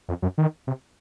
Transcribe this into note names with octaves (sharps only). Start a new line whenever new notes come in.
F2
F#2
D#3
C3